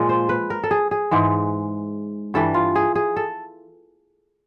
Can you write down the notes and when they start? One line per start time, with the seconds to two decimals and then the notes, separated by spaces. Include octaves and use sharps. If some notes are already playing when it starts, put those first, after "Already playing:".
Already playing: A#2 F3 G#3
0.09 C5
0.29 B4
0.50 A#4
0.64 A4
0.71 G#4
0.91 G#4
1.11 G#2 E3 G#3
2.34 G2 E3 G3 A4
2.54 F4
2.76 G#4
2.95 G#4
3.16 A4